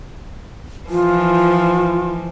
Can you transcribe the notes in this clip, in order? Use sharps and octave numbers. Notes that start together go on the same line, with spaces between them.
E3 F3 F4